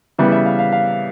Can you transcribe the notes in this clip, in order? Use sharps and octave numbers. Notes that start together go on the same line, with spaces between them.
C#3 E3 G3 B3 E5
E5
F5
F5
F5